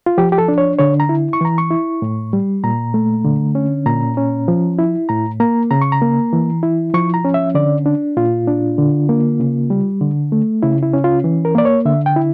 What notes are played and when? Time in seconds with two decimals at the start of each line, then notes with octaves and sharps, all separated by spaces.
0.06 F4
0.18 F3 G4
0.32 G4
0.38 A4
0.48 D4
0.58 C#5
0.79 D3 C#5
1.00 A#5
1.09 E4
1.33 C#6
1.41 E3 A#5
1.58 C#6
1.70 E4
2.02 A2
2.33 G3
2.64 A#2 A#5
2.94 A3
3.24 D3
3.55 C#4
3.86 A#2 A#5
4.17 C#4
4.48 F3
4.79 E4
5.09 A2 A#5
5.40 A#3 A#5
5.71 C#3 A#5
5.82 C#6
5.92 A#5
6.02 A#3
6.33 E3
6.63 E4
6.94 F3 C#6
7.14 A#5
7.25 C#4
7.34 E5
7.55 D3 D5
7.86 D4
8.17 A#2 F4
8.47 D4
8.78 D3
9.09 A#3
9.40 C#3
9.70 G3
10.01 D3
10.32 A3
10.63 C#3 E4
10.83 E4
10.93 C#4
11.04 F4
11.24 E3
11.45 A#4
11.55 A#3 D5
11.65 C#5
11.85 D3 E5
12.06 G5
12.16 E4